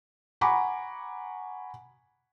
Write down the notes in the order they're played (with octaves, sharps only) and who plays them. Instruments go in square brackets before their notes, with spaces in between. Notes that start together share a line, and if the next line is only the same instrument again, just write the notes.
[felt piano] F#5 G#5 A#5 B5 C#6 D6